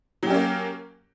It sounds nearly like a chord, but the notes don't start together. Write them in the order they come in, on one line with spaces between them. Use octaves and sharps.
F#3 G4 C#4 A#3